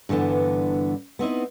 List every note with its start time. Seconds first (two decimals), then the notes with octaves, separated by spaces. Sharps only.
0.09 G2 D3 E3 B3 D4
1.19 B3 C4 D#4 E4